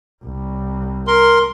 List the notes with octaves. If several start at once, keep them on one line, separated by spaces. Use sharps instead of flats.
C2
A#4 C6